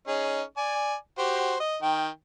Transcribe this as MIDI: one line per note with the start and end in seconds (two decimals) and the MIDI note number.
0.08 0.42 61
0.08 0.42 63
0.08 0.42 68
0.57 0.95 74
0.57 0.95 80
1.18 1.55 66
1.18 1.55 67
1.18 1.55 72
1.60 1.77 75
1.82 2.09 51
1.82 2.09 79